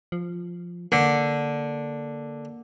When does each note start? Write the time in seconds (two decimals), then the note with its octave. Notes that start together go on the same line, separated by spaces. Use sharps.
0.12 F3
0.92 D3 A#3